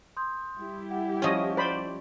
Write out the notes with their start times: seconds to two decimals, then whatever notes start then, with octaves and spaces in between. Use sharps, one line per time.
0.17 C6 D#6 G6
0.56 G3 E4 G4
0.91 F#5
1.22 F3 C#4 C#5 D#5 D#6
1.57 C5 D5 B5